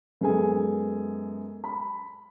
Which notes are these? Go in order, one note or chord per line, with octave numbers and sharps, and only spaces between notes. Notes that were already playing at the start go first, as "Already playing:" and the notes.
F#2 G#3 B3 G#4 A4 G#5
B5